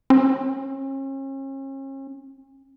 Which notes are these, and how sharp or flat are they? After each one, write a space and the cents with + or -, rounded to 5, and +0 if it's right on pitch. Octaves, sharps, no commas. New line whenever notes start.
C#4 -40